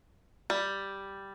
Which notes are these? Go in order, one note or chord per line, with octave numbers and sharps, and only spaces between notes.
G3